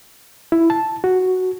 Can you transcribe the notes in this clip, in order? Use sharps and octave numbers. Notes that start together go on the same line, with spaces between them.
E4
A5
F#4